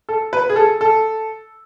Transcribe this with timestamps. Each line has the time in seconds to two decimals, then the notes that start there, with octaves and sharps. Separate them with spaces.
0.09 A4
0.33 B4
0.49 G#4
0.56 A4
0.81 A4